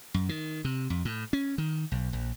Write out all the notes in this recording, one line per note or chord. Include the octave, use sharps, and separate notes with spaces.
F#2
D#3
C3
F2
A2
C#4
D#3
B1
A#1